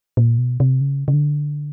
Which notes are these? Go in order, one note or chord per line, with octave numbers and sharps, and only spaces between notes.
A#2
B2
C3
C#3
C#3
D3